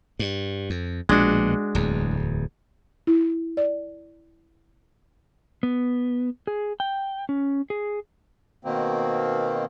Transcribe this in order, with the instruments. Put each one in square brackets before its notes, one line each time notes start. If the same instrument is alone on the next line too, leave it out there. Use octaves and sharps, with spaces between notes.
[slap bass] G2
F2
[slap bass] A#1 B2 [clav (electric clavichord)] G#3 D4 F#4
[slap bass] D1 E2
[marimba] E4
D5
[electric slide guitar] B3
G#4
G5
C#4
G#4
[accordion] B2 D#3 A#3 C4